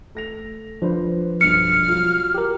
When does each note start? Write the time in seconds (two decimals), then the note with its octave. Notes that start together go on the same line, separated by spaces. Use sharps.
0.15 A3 A#6 F7
0.82 F3 D4 B4 C5
1.41 B1 G2 F6 C#7 F7
1.88 F#3 F4 F#4
2.34 G4 A#4